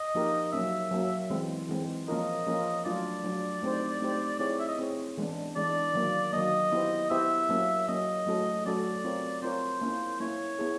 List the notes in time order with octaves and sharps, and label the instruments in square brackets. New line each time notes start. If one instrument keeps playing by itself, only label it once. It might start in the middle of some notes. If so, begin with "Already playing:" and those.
Already playing: [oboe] D#5
[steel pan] F3 A#3 D#4 G4 A#4
[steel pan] F#3 A#3 C#4 [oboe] E5
[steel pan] F#3 A#3 C#4
E3 G#3 C4
E3 G#3 C4
[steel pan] F3 A#3 C#4 F4 A#4 [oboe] D#5
[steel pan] F3 A#3 C#4 F4 A#4
[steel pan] F#3 A3 D4 F4 [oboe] D5
[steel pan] F#3 A3 D4 F4
A3 C4 D#4 G4 C5
A3 C4 D#4 G4 C5
[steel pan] C4 E4 G#4 C#5 [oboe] D5
[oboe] E5
D#5
[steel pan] C4 E4 G#4 C#5
E3 G#3 B3 D4
[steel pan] E3 G#3 B3 D4 [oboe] D5
[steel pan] D#3 F#3 A#3
[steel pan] D#3 F#3 A#3 [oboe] D#5
[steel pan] B3 E4 G4 C5
[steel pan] B3 E4 G4 C5 [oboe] E5
[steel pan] F#3 A#3 C#4
[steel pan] F#3 A#3 C#4 [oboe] D#5
[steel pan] F#3 A3 C#4 F#4 A4
[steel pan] F#3 A3 C#4 F#4 A4 [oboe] D5
[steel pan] C4 F4 A#4 C#5
[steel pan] C4 F4 A#4 C#5 [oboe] C5
[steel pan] A#3 C#4 E4
[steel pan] A#3 C#4 E4 [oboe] C#5
[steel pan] B3 E4 G#4